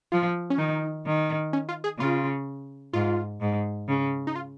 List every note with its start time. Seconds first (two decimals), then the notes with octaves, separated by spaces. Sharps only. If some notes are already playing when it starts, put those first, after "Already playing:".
0.12 F3 F4
0.50 C#4
0.58 D#3 D#4
1.05 D#3
1.53 C#4
1.69 F4
1.84 G#4
1.99 C#3 F4
2.93 G#2 F4
3.41 G#2
3.89 C#3
4.27 D#4
4.36 F4